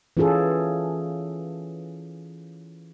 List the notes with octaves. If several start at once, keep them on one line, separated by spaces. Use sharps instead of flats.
E3 C#4 F4 G#4 A4